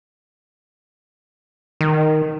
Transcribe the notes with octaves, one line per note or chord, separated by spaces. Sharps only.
D#3